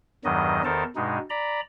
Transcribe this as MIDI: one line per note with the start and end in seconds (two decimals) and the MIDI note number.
0.25 0.62 40
0.25 0.62 43
0.25 0.62 51
0.25 0.62 54
0.25 0.62 75
0.65 0.84 40
0.65 0.84 51
0.65 0.84 69
0.65 0.84 70
0.65 0.84 72
0.65 0.84 81
0.96 1.18 43
0.96 1.18 47
0.96 1.18 56
0.96 1.18 63
1.30 1.61 74
1.30 1.61 82
1.30 1.61 83